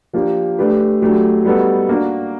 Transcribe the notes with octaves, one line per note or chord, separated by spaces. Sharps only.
F3 A#3 D4 G4
A3 D4 G4 B4
F#3 A3 D4 G4
G3 B3 D#4 F#4 A4
A#3 D4 F#4